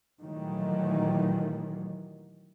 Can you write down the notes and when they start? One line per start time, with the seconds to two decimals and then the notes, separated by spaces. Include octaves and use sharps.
0.21 A#2 D#3 E3 F#3 G3 A3